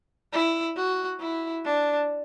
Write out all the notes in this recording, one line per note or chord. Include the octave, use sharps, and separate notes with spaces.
E4
F#4
E4
D4